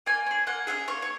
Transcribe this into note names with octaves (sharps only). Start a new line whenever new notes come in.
A#3 G#5
C#4 G#4
A#3 F#5
C#4 G#4 E5
A#3 C#5
C#5